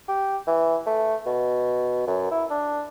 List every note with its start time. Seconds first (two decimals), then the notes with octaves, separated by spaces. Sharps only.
0.09 G4
0.47 E3
0.86 A3
1.26 B2
2.07 F#2
2.31 E4
2.50 D4